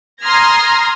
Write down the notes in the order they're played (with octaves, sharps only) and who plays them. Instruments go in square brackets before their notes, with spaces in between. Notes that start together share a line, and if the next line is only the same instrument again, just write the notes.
[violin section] A#5 C6 D#6 F6 G#6 A#6